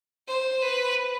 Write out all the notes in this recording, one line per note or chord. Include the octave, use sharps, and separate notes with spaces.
C5
B4